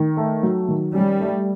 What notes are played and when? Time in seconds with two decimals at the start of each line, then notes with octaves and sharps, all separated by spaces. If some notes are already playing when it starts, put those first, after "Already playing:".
Already playing: D#3
0.17 A3
0.43 F#3
0.68 D#3
0.94 G3 C#4
1.20 A3